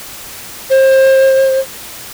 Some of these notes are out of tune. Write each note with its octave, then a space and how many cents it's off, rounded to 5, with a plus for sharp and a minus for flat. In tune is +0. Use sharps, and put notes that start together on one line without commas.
C5 +30